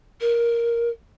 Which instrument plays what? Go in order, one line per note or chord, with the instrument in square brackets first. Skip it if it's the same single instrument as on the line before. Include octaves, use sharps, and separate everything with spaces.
[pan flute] A#4